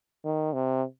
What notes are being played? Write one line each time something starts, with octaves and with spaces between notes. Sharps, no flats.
D#3
C3